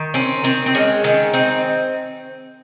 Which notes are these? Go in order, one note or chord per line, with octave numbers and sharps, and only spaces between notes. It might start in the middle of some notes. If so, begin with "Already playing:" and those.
Already playing: D#3
C4 C#4
D#3 C4
C4
G#3 C#4
D#3 C#4
C4 D#4